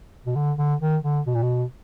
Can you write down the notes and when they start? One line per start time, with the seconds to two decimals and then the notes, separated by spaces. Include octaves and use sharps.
0.26 B2
0.36 D3
0.58 D3
0.81 D#3
1.04 D3
1.27 B2
1.35 A#2
1.43 B2